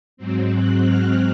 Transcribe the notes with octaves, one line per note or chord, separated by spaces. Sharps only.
G#2 F#3 C4
F#6
F6